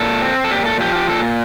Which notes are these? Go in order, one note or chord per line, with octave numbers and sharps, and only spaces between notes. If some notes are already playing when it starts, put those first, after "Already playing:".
Already playing: A#2 A4
C4
A4
A#2 G4
A4
F3 G4
G4
A#2 A4